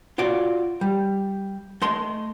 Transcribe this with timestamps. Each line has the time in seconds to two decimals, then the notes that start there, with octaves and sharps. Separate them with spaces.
0.18 F4 F#4 D5
0.81 G3
1.82 A3 D#5 C6